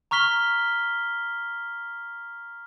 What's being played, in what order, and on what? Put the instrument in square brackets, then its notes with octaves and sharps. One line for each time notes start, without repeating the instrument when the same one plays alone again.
[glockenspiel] A#5 C#6 F6 B6 G7